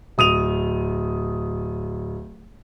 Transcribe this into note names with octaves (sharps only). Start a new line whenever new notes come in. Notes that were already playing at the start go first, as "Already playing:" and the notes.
D1 D#6 D#7 F7